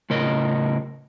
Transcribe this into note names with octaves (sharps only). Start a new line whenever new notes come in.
A2 C#3 A#4 D#5